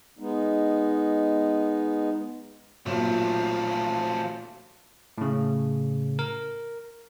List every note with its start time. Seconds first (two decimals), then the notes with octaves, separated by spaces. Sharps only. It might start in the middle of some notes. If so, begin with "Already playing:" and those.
0.19 G#3 B3 D#4
2.86 B1 A#2 F3 A3
5.18 A2 C#3
6.19 A#4